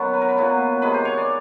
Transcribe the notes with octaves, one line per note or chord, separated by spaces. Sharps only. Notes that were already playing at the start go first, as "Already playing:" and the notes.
Already playing: D#3 F#3 B3 C#4
B4
A#4
B4
A#2 F#3 B3
C3 D#3 G#3 B4
C5
C#5
D5